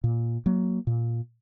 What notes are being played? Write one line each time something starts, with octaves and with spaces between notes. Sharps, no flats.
A#2
F#3 A#3
A#2